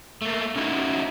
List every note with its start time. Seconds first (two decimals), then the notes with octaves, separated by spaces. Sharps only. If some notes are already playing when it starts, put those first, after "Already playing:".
0.22 A3 A#3
0.56 C#4 D#4 E4 F#4